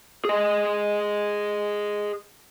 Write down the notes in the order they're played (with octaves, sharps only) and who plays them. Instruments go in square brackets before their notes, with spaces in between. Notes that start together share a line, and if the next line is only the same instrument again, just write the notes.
[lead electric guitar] G#4 D#5